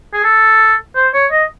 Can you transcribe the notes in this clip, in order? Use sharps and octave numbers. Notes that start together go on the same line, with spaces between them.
G#4
A4
C5
C#5
D#5